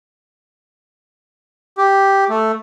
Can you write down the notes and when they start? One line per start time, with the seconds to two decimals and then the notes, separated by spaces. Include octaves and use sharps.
1.78 G4
2.29 A3